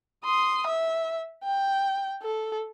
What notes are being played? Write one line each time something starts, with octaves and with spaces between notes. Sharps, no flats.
C6 D#6
E5
G5
A4